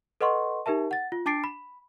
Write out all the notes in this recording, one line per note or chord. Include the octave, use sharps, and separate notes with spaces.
A4 B4 D#5 F#5 C6 C#6
D#4 G4 A#4 E5 A5
F#5 A6
F4
D4 A5 D6 A6 C7 D7
B5